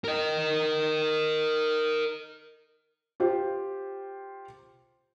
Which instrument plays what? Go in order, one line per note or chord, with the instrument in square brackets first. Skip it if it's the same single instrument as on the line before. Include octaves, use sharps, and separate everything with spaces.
[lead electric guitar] A#4 D#5
[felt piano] F4 G4 C5